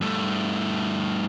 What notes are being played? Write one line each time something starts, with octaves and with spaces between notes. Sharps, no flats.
G2 A3